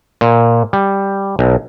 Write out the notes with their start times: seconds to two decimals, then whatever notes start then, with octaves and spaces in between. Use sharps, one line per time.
0.21 A#2
0.73 G3
1.39 B1